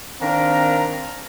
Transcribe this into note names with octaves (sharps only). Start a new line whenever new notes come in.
D#3 C4 D4 A#4 F5 A#5